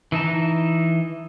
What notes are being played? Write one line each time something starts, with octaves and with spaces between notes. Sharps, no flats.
E3 D#4 A5 A#5